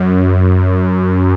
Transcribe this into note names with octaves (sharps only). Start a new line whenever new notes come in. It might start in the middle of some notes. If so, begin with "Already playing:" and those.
Already playing: F#2